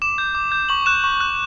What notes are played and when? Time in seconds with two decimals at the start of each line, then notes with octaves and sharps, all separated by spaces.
0.02 D6 E7
0.18 G6
0.35 D6
0.52 G6
0.69 C#6 F#7
0.86 F#6 E7
1.04 C#6
1.20 F#6